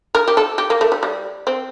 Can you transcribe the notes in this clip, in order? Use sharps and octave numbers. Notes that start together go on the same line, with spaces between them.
A#4
G4
A4
G4
A#3
A3
G3
G3
C4